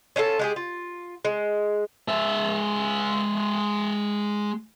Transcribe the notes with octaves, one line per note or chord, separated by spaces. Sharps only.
C#4 D4 F4 A4
G#3 G4 G#4
F4
G#3
G#3 E5